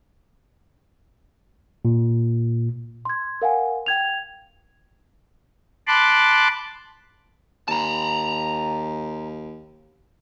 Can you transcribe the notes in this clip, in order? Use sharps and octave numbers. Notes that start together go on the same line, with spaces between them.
A#2
C6 G#6
A#4 F5 F#5 G#5
G5 G#6 F7
A5 B5 C6 D6 F#6
D#2 A5 A#5